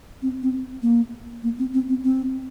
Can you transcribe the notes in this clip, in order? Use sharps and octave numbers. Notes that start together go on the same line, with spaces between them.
C4
C4
A#3
A#3
C4
C4
C4
C4